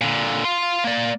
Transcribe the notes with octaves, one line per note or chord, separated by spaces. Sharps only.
A#2 D3
F5 C6
A#3 D5